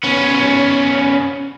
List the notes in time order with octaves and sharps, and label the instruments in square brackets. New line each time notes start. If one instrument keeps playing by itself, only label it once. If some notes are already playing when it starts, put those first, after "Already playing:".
[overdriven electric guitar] B3 C#4